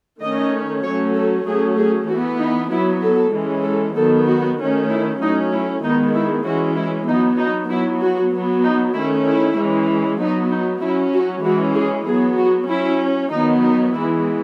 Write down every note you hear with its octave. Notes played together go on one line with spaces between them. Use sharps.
D#3 A3 C#4 D#5
F#3 A3 C#4 C#5
A4
F#3 A3 C#4 G#4
G#4
E3 B3 F#4
D#4
F#3 B3 E4
A4
E3 G#3 C#4
A4
D#3 F#3 B3 A4
F#4
D#3 A3 C#4
E4
F#3 A3 C#4 D#4
E4
D#3 G#3 B3 D#4
E4
E3 G#3 C#4 F#4
E4
F#3 B3 D#4
D#4
F#3 B3 E4
F#4
F#3 B3
D#4
D#3 A3 C#4 E4
E4
E3 G#3 C#4
F#3 B3 D#4
D#4
F#3 C#4 E4
F#4
E3 G#3 C#4 F#4
G#4
F#3 B3 G#4
F#4
F#3 C#4 E4
D#3 F#3 B3 D#4
D#4
E3 G#3 B3 E4